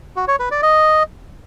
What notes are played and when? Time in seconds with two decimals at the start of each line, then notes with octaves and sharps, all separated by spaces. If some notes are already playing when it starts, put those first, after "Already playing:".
0.16 F#4
0.28 C#5
0.40 B4
0.51 D5
0.63 D#5